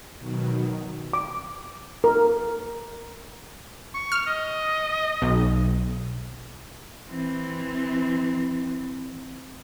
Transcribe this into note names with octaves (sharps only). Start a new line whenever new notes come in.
B2 D#3 F#3
D6
A#4
C#6
F6
D#5
B1
E3 C4